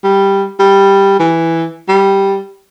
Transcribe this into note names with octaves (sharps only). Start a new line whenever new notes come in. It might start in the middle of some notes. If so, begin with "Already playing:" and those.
G3
G3
E3
G3